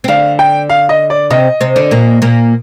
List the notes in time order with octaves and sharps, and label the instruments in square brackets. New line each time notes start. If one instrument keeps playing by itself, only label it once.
[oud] C4
[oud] D3 D4 [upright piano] F5
[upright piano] G5
F5
D#5
D5
[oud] C3 C4 [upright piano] D#5
[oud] C3 C4
D3 D4
A#2 A#3
A#2 A#3